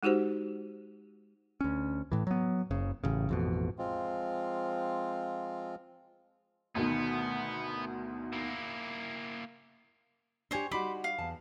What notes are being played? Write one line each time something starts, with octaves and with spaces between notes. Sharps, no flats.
G#3 D#4 F#4 G4 C5
D2 C#4
A2 E3
F#3 B3
F#1 C#3
A1 C#3
A1 F2 B2
F3 G#3 C4 F4
D2 B2 D#3 B3
A#3 E4
D4 G4 C5 C#5 G#5
G3 D#4 F#4 B5 C6 D6
F5
E2 A5